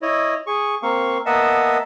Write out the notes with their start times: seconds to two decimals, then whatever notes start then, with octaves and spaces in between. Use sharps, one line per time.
0.02 E4 C#5 D#5
0.47 G#4 C#6
0.83 A#3 C4 F5 C#6
1.26 A#3 B3 D#5 E5 F#5 A5